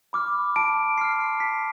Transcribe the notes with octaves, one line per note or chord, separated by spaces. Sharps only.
B5 D6 F6
A5 D7
C6 F6 C7
A5 B6